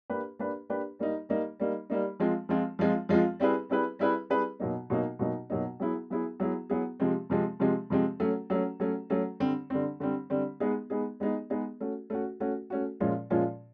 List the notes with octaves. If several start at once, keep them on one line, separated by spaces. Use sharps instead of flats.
A#3 D4 G4 B4
A#3 D4 G4 B4
A#3 D4 G4 B4
G3 A#3 D#4
G3 A#3 D#4
G3 A#3 D#4
G3 A#3 D#4
F3 G#3 C4 F4
F3 G#3 C4 F4
F3 G#3 C4 F4
F3 G#3 C4 F4
G3 C4 E4 G#4 B4
G3 C4 E4 G#4 B4
G3 C4 E4 G#4 B4
G3 C4 E4 G#4 B4
B2 F#3 A#3 D#4
B2 F#3 A#3 D#4
B2 F#3 A#3 D#4
B2 F#3 A#3 D#4
F#3 B3 E4 G#4
F#3 B3 E4 G#4
F#3 B3 E4 G#4
F#3 B3 E4 G#4
C3 F3 G#3 C4
C3 F3 G#3 C4
C3 F3 G#3 C4
C3 F3 G#3 C4
F#3 A3 C#4
F#3 A3 C#4
F#3 A3 C#4
F#3 A3 C#4
D3 G3 C4
D3 G3 C4
D3 G3 C4
D3 G3 C4
G#3 B3 D#4 G#4
G#3 B3 D#4 G#4
G#3 B3 D#4 G#4
G#3 B3 D#4 G#4
A3 C#4 F#4
A3 C#4 F#4
A3 C#4 F#4
A3 C#4 F#4
A#2 F3 G#3 C#4 F4
A#2 F3 G#3 C#4 F4